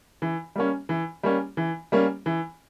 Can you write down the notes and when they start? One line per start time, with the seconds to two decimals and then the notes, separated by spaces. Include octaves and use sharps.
0.22 E3
0.56 G3 A#3 C#4
0.89 E3
1.23 G3 A#3 C#4
1.57 E3
1.92 G3 A#3 C#4
2.26 E3